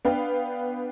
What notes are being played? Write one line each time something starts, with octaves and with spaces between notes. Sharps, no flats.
B3 D4 B4 F5 G5